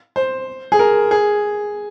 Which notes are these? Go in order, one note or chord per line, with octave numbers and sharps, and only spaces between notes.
C5
G#4
A#4
G#4